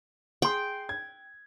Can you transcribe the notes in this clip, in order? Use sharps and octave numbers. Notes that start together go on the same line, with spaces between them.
G#4 G5 C6
G#6